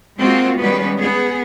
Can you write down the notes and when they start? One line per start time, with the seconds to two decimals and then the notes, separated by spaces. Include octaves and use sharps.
0.19 G#3 A#3 C4 F4 F#4
0.60 D#3 G3 G#3 B3 C#4 B4
0.98 B3 G#4